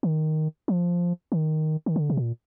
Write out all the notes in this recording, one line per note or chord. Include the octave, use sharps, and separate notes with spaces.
D#3
F3
D#3
D#3
D3
C3
A#2